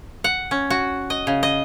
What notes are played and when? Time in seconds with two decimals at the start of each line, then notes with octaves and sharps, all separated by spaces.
0.24 F#5
0.51 C#4
0.70 F#4
1.10 D#5
1.27 C#3
1.43 D#5